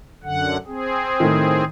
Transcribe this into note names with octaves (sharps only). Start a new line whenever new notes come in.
F#2 D3 F#5
C4 G#4
A2 D#3